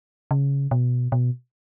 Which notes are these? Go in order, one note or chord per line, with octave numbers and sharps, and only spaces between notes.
C#3
B2
B2